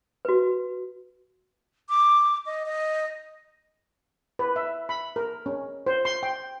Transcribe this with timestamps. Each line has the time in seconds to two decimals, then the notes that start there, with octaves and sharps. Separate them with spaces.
0.25 F#4 B4
1.89 D6
2.46 D#5
2.66 D#5
4.39 B4
4.56 E5
4.89 B5
5.16 A#4
5.46 C#4
5.87 C5
6.05 C6
6.23 G5